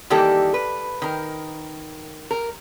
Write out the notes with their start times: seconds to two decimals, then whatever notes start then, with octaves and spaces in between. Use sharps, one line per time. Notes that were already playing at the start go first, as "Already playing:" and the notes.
0.10 D#3 E3 G3 A#3 G4 A4
0.54 B4
1.02 D#3 A#4
2.31 A#4